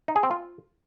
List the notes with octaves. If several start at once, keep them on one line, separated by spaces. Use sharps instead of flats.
D#4
G#4
C4
F4